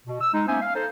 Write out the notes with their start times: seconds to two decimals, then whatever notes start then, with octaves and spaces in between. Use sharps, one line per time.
0.07 B2
0.21 E6
0.33 G#3 D#4
0.48 A#3 B3 C#4 C5 E5 G#5
0.62 F5
0.74 D#4 A4 C5